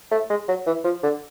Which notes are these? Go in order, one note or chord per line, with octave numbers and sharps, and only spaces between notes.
A3
G#3
F#3
E3
F3
D3